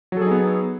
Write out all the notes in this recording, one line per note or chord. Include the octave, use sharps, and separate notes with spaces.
F#3 B3 D#4 G#4 A4